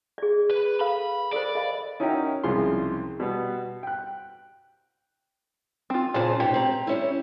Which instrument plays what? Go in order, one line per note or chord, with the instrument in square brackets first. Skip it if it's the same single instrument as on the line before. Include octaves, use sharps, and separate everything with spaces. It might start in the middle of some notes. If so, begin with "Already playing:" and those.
[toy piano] G#4 D5
[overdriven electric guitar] B4
[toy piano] A4 B4 F5 [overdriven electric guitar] B5
[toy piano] A4 A#4 C5 [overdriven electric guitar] D5
[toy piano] D#5 F5 B5
[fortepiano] C#4 D#4 E4 F#4 A#4 G5
C2 C#3 F3 G#3 C6
B2 G3 B3
G5 F#6
[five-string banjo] C4 F4
[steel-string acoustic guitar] A#2 C#3 C5 [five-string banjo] F4 A5
[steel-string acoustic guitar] G#2 B2 [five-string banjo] G4
[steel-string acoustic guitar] C4 A#5
G3 C#4 E4